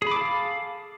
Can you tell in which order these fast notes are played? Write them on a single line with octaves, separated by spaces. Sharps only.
G#4 B5 D6 A4 F5